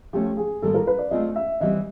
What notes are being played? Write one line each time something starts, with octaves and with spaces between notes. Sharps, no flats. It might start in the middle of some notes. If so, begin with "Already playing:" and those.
F3 A3 C#4 F4 G4
G#4
G#2 D#3 G3 A#3 D#4 A4
A#4
B4
D5
A3 C4 F4 G#4 D#5
E5
E3 G3 C4 D#5